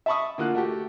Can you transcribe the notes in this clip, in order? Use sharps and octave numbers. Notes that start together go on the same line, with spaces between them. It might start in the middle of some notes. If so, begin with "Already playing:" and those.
E5 A5 B5 C#6 D#6
D3 A#3 F4 F#6
A3 F#4 G4